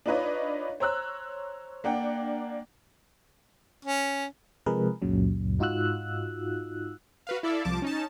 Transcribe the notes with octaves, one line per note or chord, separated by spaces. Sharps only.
D4 D#4 F4 B4 C#5 D#5
C5 C#5 A#5 E6 F#6
A#3 D4 F#5 G5
C#4
C3 F3 G#3 G#4 A#4 B4
C#2 F#2 A#2 C#3 F#3
G#2 D#4 F4 F#4 E6 F#6
F#4 B4 F5
E4 A4 D5 E5 F5
C2 F3 A5 D6
C#4 D#4 A5